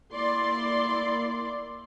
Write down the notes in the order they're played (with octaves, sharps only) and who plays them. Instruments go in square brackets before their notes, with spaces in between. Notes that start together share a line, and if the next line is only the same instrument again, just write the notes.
[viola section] A#3 E4 D5 C6